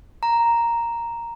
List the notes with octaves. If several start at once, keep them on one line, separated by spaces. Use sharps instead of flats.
A#5